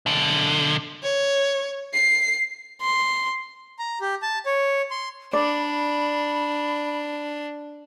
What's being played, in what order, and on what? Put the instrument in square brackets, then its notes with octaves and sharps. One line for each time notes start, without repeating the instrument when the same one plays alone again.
[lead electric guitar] B1 D3
[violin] C#5
C7
C6
[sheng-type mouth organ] A#5
G4
A5
C#5
C6
[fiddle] D4 [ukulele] D5 [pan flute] B5